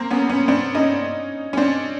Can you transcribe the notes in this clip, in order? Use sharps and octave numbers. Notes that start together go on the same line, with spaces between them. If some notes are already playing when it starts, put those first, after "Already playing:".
Already playing: A#3 C4
B3 C#4
B3 C#4
C4 D4
C#4 D#4
C#4
C4 D4